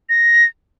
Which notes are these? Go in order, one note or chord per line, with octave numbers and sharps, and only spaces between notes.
A#6